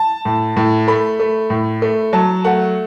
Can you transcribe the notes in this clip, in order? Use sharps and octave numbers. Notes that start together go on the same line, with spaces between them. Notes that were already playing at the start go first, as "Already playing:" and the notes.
Already playing: A5
A2
A2
A3 B5
A3
A2
A3
F#3 A5
A3 F#5